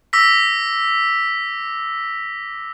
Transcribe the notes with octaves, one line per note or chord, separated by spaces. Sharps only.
D6 E6 A#6 B6